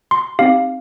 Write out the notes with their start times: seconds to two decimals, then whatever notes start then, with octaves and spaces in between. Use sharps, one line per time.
0.11 C6
0.39 C4 D#4 G4 F5